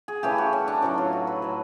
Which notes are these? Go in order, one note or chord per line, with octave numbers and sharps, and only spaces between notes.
G#4
C#3 E3 A3 G4
F#4
C#4
D4
A2 F#3 A3 D#4
F4
F#4
B4
A2 F#3 A3